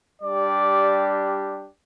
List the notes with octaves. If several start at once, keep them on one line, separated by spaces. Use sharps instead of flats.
G3 D4 G4 D5